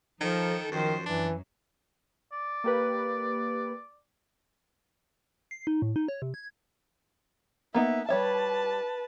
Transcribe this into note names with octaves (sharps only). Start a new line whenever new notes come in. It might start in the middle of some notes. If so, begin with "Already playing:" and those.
D#3 F3 D#4 A4
F#2 D#3 F3 C5
F#2 E3 D4
D5
A#3 G4 B4
C7
D#4
A2
D#4
C#5
C3
G#6
A#3 B3 D#4 E5
G3 B4 C#5 E5 A5